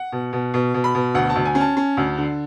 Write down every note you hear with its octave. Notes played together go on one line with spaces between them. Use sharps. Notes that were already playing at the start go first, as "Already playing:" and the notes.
Already playing: F#5
B2
B2
B2
B2
B5
B2
D2 F#5
A5
D2
G#5
C#4
A5
C#4
D2
D3